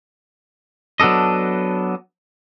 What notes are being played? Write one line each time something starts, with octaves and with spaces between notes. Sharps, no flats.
F#3 B3 D4 A4 D#5